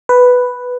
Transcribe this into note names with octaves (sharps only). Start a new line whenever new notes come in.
B4